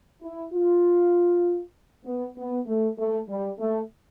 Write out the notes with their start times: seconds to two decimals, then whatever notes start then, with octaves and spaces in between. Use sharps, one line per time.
0.23 E4
0.53 F4
2.06 B3
2.38 B3
2.67 A3
2.98 A3
3.29 G3
3.59 A3